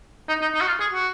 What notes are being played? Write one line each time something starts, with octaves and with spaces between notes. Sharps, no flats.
D#4
D#4
D#4
F#4
F4
G#4
F#4